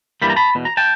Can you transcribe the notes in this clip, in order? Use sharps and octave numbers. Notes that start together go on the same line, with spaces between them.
G2 E3 G3 A#3 B5
A#5
A5 B5
E2 B2
A#5
G5 A5